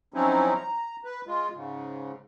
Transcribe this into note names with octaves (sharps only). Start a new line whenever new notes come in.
F3 F#3 C4 C#4 D#4 E4
A#5
B4
G#3 F4
G#2 C#3